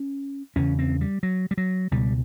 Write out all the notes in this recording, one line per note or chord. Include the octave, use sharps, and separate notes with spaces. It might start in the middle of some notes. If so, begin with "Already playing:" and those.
Already playing: C#4
E2 C#3 C#4
C4
G3
F#3
G3
F#3
C#2 B2 G3